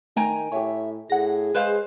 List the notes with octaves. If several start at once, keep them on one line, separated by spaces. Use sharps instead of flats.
D#3 A3 G5 G#5 A#5
A2 G4 C#5 E5
A2 G#4 F#5 A#6
G#3 B4 C5 F5